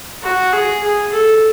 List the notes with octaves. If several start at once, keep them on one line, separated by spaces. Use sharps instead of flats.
F#4
G#4
G#4
A4